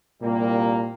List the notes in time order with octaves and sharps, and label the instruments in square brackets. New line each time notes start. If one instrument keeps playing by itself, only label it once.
[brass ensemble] C2 G3 A#3 [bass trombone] A#2